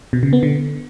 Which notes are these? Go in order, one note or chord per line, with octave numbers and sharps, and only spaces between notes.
B2
C#3
B3
D3